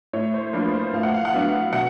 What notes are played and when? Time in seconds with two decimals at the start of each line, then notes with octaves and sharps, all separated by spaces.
0.13 A2 C#5
0.34 C5
0.53 F3 A#3 D4 F4 B4
0.74 C5
0.94 A2 F5
1.03 F#5
1.14 F5
1.25 F#5
1.34 F#3 B3 D4 F5
1.73 B2 F#5